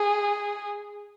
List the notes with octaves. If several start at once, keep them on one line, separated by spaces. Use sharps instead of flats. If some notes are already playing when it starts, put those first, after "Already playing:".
Already playing: G#4